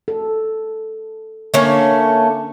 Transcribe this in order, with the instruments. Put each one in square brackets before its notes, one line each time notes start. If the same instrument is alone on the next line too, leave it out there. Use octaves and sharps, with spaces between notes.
[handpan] A4
[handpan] D3 [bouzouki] A3 A#3 C#4